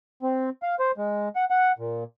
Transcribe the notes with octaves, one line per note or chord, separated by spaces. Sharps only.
C4
F5
C5
G#3
F#5
F#5
A#2